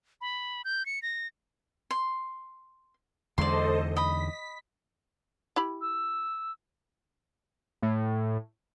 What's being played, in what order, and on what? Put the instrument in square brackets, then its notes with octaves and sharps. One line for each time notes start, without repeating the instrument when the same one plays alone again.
[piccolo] B5
G6
C#7
A#6
[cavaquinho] C6
[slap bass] E2 D3 G#3 [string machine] A4 C5 D#5 [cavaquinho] D5 C6
[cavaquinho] D#5 B5 [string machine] B6
[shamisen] E4 G4 B5
[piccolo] E6
[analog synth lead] A2